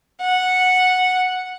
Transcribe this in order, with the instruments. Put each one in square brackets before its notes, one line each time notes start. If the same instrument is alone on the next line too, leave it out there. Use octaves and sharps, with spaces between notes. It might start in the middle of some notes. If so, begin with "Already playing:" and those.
[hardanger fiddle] F#5